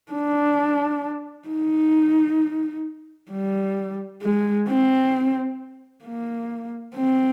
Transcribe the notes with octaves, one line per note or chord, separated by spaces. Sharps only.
D4
D#4
G3
G#3
C4
A#3
C4